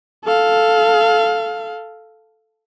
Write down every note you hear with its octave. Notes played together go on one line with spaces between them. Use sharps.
A4 F5